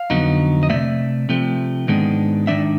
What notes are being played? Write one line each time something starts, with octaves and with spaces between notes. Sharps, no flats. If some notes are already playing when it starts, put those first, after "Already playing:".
Already playing: F5
F2 D3 F#3 B3 D#4
D#5
C3 F3 A3 D5 E5
C3 F3 A3
G#2 D#3 G#3 B3 D4
G#2 D#3 G#3 B3 D4 D5 E5